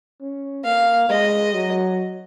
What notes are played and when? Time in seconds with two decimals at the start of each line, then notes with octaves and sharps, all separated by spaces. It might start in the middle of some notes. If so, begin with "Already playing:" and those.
0.21 C#4
0.65 A#3 F5
1.09 G#3 D#5
1.54 F#3